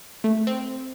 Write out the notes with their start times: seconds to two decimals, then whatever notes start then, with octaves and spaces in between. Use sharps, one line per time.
0.24 A3
0.47 C4